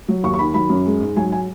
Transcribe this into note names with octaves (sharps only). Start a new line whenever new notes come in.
F#3
D#2 C#6
C#6
D#3 B5
F#3 B5
F#2
G#3
G#2
F#3 G#5
G#5